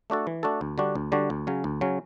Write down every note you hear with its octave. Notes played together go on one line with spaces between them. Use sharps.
A3 D4 F#4 A4
E3
A3 D4 F#4 A4
D2
D3 G3 D4 F#4
D2
D3 G3 D4 F#4
D2
C#3 F#3 C#4
D2
C#3 F#3 C#4